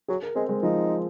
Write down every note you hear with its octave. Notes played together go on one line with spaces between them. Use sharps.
F#3 G#4
A#4
G#3 C4
G#3
F3 D#4